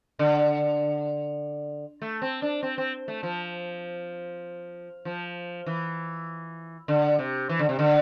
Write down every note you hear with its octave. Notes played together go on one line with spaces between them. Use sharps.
D3
A3
C4
D4
C4
C4
A3
F3
F3
E3
D3
C3
E3
D3
C3
D3